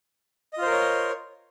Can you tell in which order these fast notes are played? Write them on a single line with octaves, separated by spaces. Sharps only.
D#5 F4 C5 A#4 C#5